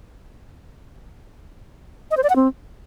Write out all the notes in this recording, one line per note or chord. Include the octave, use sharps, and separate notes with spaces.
D#5
C5
D5
F#5
C4